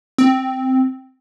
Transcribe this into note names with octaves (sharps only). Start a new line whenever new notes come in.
C4